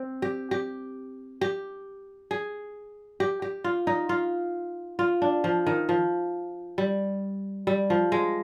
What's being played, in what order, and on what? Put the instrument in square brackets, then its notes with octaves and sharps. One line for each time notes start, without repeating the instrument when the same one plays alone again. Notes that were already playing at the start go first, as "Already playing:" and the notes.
Already playing: [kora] C4
G4
G4
G4
G#4
G4
G4
F4
D#4
F4
F4
D4
F3
D#3
F3
G3
G3
F3
G#3